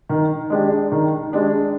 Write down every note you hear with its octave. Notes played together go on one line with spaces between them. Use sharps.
D#3
G#3 D4 G4
D#3
G#3 D4 G4